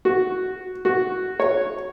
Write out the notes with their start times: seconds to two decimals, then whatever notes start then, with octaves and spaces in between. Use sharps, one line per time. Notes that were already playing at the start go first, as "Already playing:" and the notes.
0.05 F#4
0.85 F#4
1.40 C#5